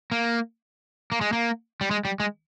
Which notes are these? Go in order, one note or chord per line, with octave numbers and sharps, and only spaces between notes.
A#3
A#3
G#3
A#3
G3
G#3
G3
G#3